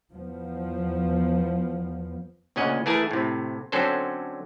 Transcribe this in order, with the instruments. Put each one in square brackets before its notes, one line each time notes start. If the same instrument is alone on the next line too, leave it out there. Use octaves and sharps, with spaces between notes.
[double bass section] E2 F3 B3
[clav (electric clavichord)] D2 A#2 C#3 C#4 D#5 F#5
E3 A3 G#4 A#4 G#5 A5
A2 C3
D3 F#3 C4 C#4 A4 C5